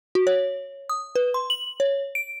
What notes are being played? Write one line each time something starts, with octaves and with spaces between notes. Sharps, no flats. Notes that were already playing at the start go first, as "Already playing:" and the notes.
F#4
C#5
D#6
B4
C6
F#7
C#5
D7